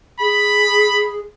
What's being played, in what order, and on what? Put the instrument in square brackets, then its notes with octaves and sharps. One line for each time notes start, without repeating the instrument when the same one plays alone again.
[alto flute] G#4 [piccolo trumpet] B5